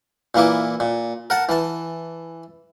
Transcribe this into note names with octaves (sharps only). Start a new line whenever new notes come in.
A#2 E3 A#3 E4 D6
A#2
A#4 F#5 A5
E3 A5